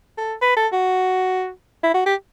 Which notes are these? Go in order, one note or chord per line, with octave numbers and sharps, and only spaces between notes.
A4
B4
A4
F#4
E4
F#4
G4